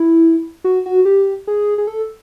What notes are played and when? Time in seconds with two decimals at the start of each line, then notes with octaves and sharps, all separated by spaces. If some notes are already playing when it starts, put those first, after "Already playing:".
Already playing: E4
0.64 F#4
0.86 F#4
1.05 G4
1.47 G#4
1.78 G#4
1.87 A4